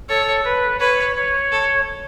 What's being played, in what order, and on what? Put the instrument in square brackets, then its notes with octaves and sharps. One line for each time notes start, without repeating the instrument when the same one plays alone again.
[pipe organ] A4 [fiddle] C#5
[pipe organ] B4
[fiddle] B4 [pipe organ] C#5
[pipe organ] C#5
[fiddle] A4